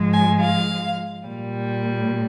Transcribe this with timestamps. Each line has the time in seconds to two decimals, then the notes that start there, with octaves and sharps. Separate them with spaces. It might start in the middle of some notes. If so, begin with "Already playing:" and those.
Already playing: G#2 F3 G#3
0.13 G#5
0.41 F5
1.26 A#2 G3